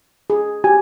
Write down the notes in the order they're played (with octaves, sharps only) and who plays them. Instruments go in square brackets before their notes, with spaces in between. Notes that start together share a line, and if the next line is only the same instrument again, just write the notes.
[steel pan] G#4
[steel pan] F#4 G4 [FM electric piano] G#5